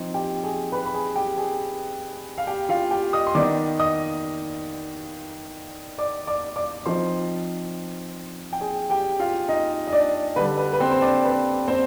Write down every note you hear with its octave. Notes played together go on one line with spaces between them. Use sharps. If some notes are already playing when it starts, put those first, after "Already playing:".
Already playing: F3 C4 D#4
G4 G5
G#4 G#5
B4 B5
B5
G#4 G#5
G4 G5
G#4 G#5
F5
G4 G5
F4 F5
G4 G5
D#5 D#6
C6
D#3 B3 D#4 D5 D6
D#5 D#6
D5 D6
D5 D6
D5 D6
F3 C4 D#4 C5 C6
G5
G#4 G#5
G4 G5
F4 F5
D#4 D#5
D#5
D4 D5
D3 G3 D4 B4
B4
B4
C4 C5
C5
D4 D5
B4
C4 C5